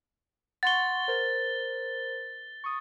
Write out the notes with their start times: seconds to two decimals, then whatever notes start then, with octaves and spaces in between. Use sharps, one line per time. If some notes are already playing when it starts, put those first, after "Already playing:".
0.63 F#5 C6 C#6 A6 G7
1.08 A#4 C5
2.64 C#6 D#6